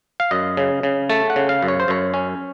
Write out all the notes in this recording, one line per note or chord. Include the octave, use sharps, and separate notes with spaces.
F5
F#2 D#5
C#3
C#3
A3 A5
F#5
C#3
F5
F#2
C#5
C5
F#2 C#5
C#4